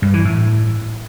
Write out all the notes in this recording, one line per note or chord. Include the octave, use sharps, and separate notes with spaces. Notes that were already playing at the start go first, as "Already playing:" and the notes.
G2
E3
A2